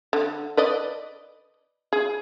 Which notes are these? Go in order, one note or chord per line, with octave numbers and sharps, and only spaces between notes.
D3
B4 D5 D#5
G#4